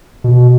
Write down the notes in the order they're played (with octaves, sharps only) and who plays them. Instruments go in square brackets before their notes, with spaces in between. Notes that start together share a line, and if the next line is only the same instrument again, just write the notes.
[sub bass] B2